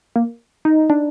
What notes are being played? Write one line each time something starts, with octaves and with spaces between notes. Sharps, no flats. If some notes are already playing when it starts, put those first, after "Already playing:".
A#3
D#4
D4